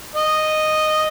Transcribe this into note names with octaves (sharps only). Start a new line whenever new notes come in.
D#5